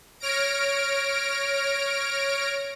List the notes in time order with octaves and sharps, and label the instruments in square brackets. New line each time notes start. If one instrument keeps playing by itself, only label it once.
[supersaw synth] C#5 F6 A#6 D7